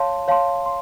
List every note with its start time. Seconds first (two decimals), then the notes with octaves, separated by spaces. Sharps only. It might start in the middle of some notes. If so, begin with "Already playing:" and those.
Already playing: C#5 F5 A5 C6
0.28 C#5 F5 A5 C6
0.66 C6